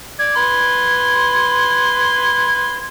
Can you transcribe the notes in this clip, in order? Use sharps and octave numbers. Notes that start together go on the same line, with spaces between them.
D5 G#6
B4 C6